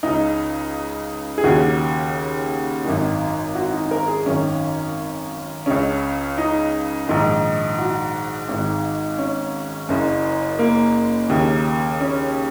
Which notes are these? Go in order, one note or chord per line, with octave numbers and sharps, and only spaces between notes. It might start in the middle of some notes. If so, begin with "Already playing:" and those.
C#2 C#3 D#4
G#4
D#2 C#3 F#4
G#1 F#2 D#3
F#4
D#4
A#4
G#4
G#1 F#2 D#3 C#4
C#2 C#3 C#4
D#4
A#1 G#2 D#3
F#4
G#1 G#2 D#3
C#4
F#1 F#2 C#3
A#3
D#2 C#3
C#4